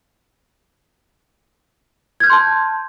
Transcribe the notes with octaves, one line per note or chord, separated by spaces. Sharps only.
A5 C6 F6 G6 G#6